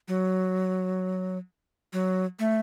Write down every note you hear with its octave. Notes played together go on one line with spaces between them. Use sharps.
F#3
F#3
A3